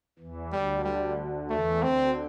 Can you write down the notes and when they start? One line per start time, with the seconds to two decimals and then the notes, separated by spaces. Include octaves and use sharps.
0.19 E2 E3
0.52 D2 D3 G3
0.84 G3
1.50 E2 E3 A3
1.83 D2 D3 C4